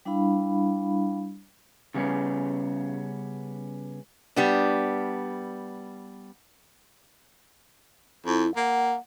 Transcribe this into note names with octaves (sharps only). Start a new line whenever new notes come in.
G3 D4 E4 F5 B5
C#3 G3 B3 C#4
G3 B3 D4
F2 E4
A#3 F#5